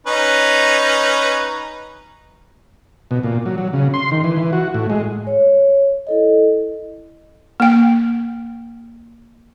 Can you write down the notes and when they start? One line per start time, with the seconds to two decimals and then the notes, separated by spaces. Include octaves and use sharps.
0.07 C#4 D#4 B4
3.11 B2
3.23 A#2
3.46 F#3
3.58 F#3
3.73 C#3
3.94 C6
4.11 D#3
4.24 E3
4.36 E3
4.53 F#4
4.75 A2
4.90 G#3
5.27 C#5
6.07 E4 A4 D#5
7.60 A#3 G5